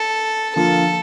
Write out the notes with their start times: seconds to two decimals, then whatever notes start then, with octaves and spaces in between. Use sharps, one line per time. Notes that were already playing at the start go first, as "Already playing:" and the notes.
Already playing: A4
0.56 D3 F3 A#3 F4 A4